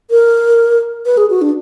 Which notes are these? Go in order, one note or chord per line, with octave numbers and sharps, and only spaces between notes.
A#4
B4
G#4
F#4
D4